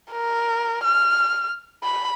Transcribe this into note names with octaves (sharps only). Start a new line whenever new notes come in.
A#4
F6
B5